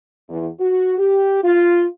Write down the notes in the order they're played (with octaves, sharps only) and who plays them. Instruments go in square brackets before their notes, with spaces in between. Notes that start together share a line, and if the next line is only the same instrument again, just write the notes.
[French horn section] E2
F#4
G4
F4